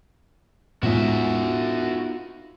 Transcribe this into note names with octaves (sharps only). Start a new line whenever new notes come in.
A2 G#3 B3 D#4 F4 F#4 E5